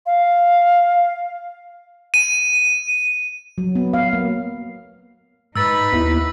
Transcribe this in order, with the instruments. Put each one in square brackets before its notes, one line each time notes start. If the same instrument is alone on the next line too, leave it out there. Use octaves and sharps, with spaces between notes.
[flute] F5
[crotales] D#7
[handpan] F#3
B3
F5
A#3
[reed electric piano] G#2 [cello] D#4 B4 [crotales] E6 A6
[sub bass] D#2 [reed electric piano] B3 E4